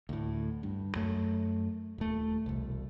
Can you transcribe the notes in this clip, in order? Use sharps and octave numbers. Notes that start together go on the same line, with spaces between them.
D2 A2
G2
F#2 A3
D#1 A3
E1 C2